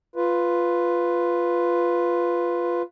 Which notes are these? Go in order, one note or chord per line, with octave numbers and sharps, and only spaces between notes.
F4 B4